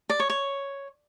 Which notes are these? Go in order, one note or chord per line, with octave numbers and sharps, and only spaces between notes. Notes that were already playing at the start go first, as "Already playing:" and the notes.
D5
C#5
C#5